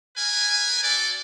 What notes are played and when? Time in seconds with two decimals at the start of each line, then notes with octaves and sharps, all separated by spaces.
0.16 A#4 B4 G#5
0.84 F#4 A4 D5